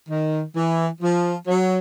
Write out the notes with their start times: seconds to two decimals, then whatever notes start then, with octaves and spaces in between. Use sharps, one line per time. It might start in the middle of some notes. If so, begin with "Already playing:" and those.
0.10 D#3
0.55 E3
1.02 F3
1.47 F#3